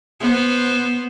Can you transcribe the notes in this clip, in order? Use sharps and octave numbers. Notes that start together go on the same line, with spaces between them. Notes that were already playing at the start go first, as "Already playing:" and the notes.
B3 C5